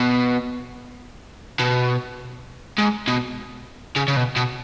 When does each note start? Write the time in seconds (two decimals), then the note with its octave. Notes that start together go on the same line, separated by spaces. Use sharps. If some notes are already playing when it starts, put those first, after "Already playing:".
Already playing: B2
1.60 B2
2.78 G#2
3.08 B2
3.96 C#3
4.08 C#3
4.16 B2
4.36 B2